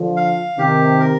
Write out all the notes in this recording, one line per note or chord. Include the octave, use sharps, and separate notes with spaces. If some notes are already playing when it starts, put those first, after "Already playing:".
Already playing: D3 F3
F5
C3 D#3 G4
A#4